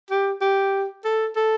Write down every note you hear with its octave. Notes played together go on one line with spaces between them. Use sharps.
G4
G4
A4
A4